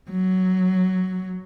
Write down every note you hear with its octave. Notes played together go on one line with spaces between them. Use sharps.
F#3